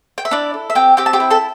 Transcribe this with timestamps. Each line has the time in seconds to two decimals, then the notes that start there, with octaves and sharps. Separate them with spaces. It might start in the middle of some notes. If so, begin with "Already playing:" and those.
0.18 G5
0.25 E5
0.31 D4 E4 D5
0.54 A4
0.70 E5
0.75 C4 G4 G5
0.97 C4 G4 G5
1.06 A5
1.13 G4 G5
1.20 E4
1.30 A4 A5